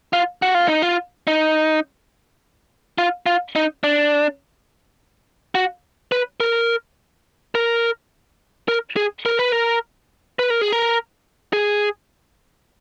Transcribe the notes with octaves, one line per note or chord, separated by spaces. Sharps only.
F4
F#4
F4
D#4
F4
D#4
F4
F4
D#4
D4
F#4
B4
A#4
A#4
A#4
G#4
A#4
B4
A#4
B4
A#4
G#4
A#4
G#4